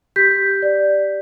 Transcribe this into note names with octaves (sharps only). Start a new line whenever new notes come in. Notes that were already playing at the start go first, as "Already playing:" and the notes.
G4 G6 B6
D5